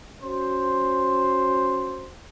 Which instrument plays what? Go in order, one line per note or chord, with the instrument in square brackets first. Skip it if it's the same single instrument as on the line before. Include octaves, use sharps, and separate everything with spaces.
[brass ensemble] C#4 F#4 C5